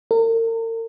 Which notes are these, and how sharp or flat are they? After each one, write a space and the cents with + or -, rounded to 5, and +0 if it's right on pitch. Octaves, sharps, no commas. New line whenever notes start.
A#4 -40